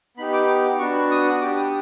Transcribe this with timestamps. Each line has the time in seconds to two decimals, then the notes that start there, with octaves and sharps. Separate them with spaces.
0.17 B3 D#4 G4 B5
0.33 D6
0.79 B3 D4 F#4 C#6
1.11 D#6
1.41 D4 G4 D6
1.57 D#6